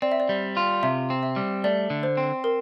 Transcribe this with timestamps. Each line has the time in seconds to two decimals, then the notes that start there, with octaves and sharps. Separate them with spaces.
0.02 C4 D5
0.12 E5
0.20 D5
0.29 G3
0.57 F4
0.83 C3 E5
1.10 C4
1.23 E5
1.36 G3
1.64 A3 D5
1.90 D3
2.03 C5
2.17 C4
2.44 A#4